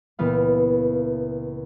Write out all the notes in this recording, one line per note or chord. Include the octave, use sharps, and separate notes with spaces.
C#2 A#2 E3 B3 F5